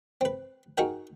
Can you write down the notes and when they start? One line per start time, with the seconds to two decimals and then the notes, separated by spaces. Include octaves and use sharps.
0.21 C4 B4
0.78 D#4 F#4 G#4 A#4 G5